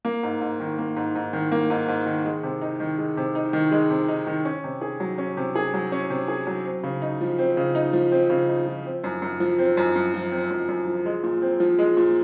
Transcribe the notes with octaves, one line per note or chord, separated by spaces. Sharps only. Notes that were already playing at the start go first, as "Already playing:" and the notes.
A#3
G#2
G#2
D#3
A#3
G#2
G#2
D#3
A#3
G#2
G#2
D#3
G#3
C3
D#4
D#3
G#3
C3
D#4
D#3
G#3
C3
D#4
D#3
C#4
C3
G#4
F#3
C#4
C3
G#4
F#3
C#4
C3
G#4
F#3
C4
C#3
D#4
F3
C4
C#3
D#4
F3
C4
C#3
D#4
F3
C4
F#2
F#2
F3
C4
F#2
F#2
F3
C4
F#2
F#2
F3
G#3
A#2
C4
F3
G#3
A#2